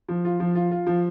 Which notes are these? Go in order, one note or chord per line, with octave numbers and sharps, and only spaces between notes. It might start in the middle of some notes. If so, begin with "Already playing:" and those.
F3
F4
F3
F4
F4
F3